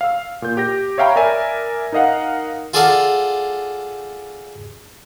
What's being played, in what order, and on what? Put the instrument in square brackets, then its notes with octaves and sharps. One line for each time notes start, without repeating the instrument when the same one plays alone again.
[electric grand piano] F5 E6
A#2 G6
G4 G6 A#6
C#5 E5 F5 G5 A#5 B5
A#4 D5 E5 G#5
D#4 A#4 D#5 F5 F#5
[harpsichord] F4 G#4 A4 D5 F5 F#5